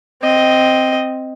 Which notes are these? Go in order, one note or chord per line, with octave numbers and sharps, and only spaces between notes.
C4 D#5